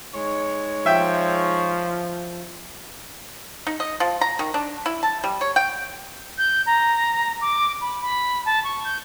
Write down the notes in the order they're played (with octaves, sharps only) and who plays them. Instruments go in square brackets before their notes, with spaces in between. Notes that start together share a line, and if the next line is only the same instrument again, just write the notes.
[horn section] G#3 D#4 C#5
[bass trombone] F3 [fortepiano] E5 G5
[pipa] D#4
D#5
F3
A#5
D#3
D4
E4
A5
G3
C#5
G5
[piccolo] G6
A#5
D6
B5
B5
A5
C#6
G6